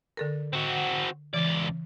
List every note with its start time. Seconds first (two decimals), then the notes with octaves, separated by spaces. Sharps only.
0.17 D3 A4 A#4
0.53 C4 F#4
1.34 C#2 C#3 E3 D5 D6